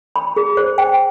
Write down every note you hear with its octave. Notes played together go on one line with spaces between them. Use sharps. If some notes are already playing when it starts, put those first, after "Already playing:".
B5
G#4
C5
G5